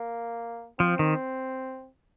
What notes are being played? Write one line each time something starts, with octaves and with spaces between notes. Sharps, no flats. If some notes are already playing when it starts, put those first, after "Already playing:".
Already playing: A#3
F3 C4
D#3